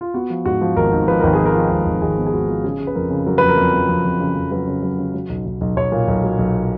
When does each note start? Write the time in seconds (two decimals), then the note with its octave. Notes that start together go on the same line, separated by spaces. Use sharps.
0.01 F4
0.14 B3 F#4
0.30 F3
0.46 G#2 F#4
0.61 F3
0.76 G#1 A#4
0.93 G#2
1.08 F3 B4
1.20 G#1 A#4
1.33 G#4
1.39 F3
1.46 A#4
1.55 F3
1.71 G#1
1.86 G#1
2.02 G#1 G#4
2.18 B3
2.26 G#4
2.33 G#1 F#4
2.49 F3
2.64 C#3 G#4
2.80 C#3
2.87 B4
2.95 F2 A#4
3.10 C#3
3.26 F#3 A#4
3.38 F2 B4
3.49 A#4
3.58 F2
3.73 F2
3.89 F2
4.04 F2
4.20 C#3
4.36 F2
4.51 F#3 B4
4.67 C#3
4.83 F#3
4.99 C#3
5.14 F#3
5.30 B1
5.46 B1
5.61 B1
5.77 B1 C#5
5.92 A#2
6.08 B1
6.24 F#3
6.39 B1